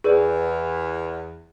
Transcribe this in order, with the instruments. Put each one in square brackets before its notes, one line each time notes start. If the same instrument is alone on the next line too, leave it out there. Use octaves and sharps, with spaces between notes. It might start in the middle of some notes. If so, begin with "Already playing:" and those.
[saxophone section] E2 [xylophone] G#4 B4 D5